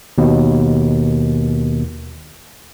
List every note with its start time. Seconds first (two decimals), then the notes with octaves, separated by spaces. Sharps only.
0.18 D#2 B2